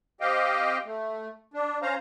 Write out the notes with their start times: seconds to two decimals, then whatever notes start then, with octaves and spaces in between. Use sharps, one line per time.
0.21 C4 G4 D#5 F5 G5
0.85 A3
1.54 D4
1.82 C#4 C5 F5 A#5